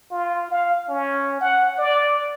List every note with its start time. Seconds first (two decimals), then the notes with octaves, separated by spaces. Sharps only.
0.11 F4
0.51 F5
0.89 C#4
1.41 F#5
1.78 D5